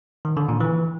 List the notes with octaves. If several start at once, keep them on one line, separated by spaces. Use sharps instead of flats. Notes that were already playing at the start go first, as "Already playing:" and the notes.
D#3
D3
A#2
E3